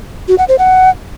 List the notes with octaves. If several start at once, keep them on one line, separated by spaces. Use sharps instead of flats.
F#4
F#5
C5
F#5